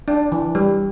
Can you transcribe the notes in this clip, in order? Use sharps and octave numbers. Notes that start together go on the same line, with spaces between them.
D4
E3
G3